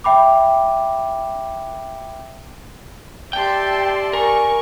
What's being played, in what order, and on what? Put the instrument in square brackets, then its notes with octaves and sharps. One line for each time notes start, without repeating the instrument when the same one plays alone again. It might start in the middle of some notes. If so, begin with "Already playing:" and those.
[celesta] E5 G5 B5 D6
[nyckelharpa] G4 D5 [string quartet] E5 A5 C6 [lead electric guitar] G5
[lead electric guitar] A#4 [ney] G#5 [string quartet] C#6